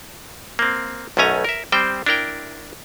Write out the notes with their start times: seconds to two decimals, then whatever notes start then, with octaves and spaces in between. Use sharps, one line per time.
0.59 A#3 C4
1.17 B1 F#2 A3 C#4 G#5 A#5
1.44 A#4 E5
1.72 G3 C4 C5 G5
2.06 D4 E4 A#4 G5